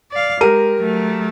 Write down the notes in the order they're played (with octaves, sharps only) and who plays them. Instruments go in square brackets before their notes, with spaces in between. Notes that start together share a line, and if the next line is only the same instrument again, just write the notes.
[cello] D5 F5
[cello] G#3 [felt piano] G4 A#4 D#7
[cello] F#3 A3